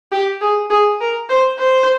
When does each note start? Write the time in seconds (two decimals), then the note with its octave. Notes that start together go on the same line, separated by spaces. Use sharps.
0.12 G4
0.41 G#4
0.70 G#4
1.01 A#4
1.29 C5
1.59 C5